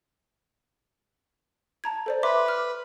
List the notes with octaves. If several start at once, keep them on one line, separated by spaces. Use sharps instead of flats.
A5 A#5 G#6
A4 C5 D5
B4 E5 C6 D6
D6 F6